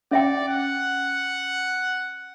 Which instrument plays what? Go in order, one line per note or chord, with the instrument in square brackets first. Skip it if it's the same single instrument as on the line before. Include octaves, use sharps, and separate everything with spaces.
[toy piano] C#4 E5 G5 [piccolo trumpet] D5
[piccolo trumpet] F#5